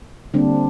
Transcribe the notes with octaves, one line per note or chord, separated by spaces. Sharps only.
D3 G3 A#3 C4 D4